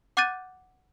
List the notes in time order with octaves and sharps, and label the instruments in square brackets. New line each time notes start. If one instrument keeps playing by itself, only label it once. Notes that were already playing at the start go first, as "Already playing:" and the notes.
[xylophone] F#5 D6 F#6 G6 A6 D#7